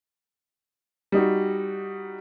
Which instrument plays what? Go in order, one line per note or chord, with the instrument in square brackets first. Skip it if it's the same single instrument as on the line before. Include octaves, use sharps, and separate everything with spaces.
[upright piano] G3 D#4 F#4